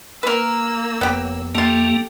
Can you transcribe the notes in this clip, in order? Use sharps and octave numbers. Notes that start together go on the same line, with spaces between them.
A#3 A#4 B4 E6
F#1 F2 B3 G4
F2 A3 A#3 F4 G4 A4